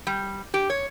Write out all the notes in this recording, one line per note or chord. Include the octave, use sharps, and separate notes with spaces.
G3
G4
C#5